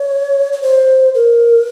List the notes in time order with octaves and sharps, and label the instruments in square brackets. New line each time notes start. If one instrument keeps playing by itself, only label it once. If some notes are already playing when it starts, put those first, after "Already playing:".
Already playing: [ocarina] C#5
C#5
C5
A#4